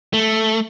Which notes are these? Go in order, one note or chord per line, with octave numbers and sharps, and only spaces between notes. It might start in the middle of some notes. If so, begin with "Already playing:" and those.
A3